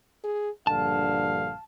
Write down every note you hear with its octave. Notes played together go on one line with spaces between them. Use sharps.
G#4
A#1 G2 D3 F5 A5